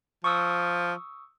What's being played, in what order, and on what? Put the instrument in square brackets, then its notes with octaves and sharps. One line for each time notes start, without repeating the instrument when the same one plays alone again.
[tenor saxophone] F3 [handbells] C#6 D#6 E6